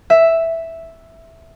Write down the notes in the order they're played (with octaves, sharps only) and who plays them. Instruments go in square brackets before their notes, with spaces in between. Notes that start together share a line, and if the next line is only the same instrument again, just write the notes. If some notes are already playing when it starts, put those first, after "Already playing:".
[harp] E5